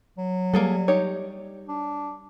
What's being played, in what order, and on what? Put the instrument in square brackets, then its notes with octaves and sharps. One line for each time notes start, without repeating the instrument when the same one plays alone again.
[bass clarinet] F#3
[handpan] G3 [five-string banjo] A#3 G#4 A4
[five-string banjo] D#4 G4 C#5
[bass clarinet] D4